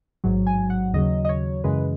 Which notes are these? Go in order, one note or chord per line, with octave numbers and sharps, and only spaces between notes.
A1 G#2 F#3
G#5
F#5
D#2 C#3 F#3 D#5
D#5
C#5
F#2 C#3 E3 G#3 B4